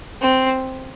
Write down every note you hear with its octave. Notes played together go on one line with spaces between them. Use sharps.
C4